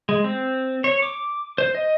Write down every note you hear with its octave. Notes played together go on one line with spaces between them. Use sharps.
G#3
C4
C#5
D6
C5
D#5